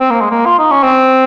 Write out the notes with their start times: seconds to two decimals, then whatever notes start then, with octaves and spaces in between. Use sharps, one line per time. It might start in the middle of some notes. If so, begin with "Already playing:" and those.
0.01 C4
0.11 A#3
0.21 G#3
0.31 A#3
0.46 F4
0.59 D#4
0.71 C#4
0.83 C4